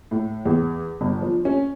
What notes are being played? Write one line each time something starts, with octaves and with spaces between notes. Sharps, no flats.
A2
E2
G1
F3
C#4